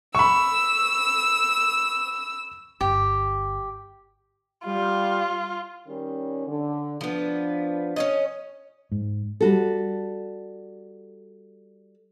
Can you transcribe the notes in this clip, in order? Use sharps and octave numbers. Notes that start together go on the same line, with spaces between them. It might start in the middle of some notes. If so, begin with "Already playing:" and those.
B5 C#6 E6
G1 G4
G3 F4
D#3 G3 C#4
D3
F3 B3 D4
C#4 C#5 D#5
G#2
G3 F#4 A4